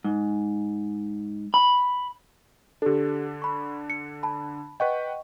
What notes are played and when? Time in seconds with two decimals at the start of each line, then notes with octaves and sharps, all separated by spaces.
0.04 G#2
1.54 B5
2.82 D3 D4 G4 A4
3.42 B5 C#6
3.90 C#7
4.23 A5 B5
4.80 B4 D#5 F#5 G5 C#6